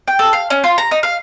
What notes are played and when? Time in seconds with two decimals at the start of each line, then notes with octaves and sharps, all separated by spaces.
0.08 G5
0.19 A4
0.33 F5
0.50 C#4
0.64 F4
0.78 A#5
0.91 D#4
1.03 F5